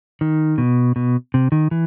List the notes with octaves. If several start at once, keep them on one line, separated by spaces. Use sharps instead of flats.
D#3
B2
B2
C3
D#3
E3